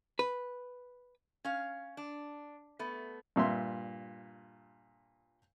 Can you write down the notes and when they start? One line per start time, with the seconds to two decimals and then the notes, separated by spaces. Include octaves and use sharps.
0.19 B4
1.45 C#4 F5
1.97 D4
2.79 A3 B3
3.36 G2 A#2 E5 C6